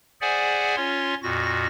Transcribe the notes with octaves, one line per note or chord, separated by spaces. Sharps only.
G#4 C5 D5 E5 F#5 G#5
C#4 F4 C#5 C6
F2 A#2 F#4 A#6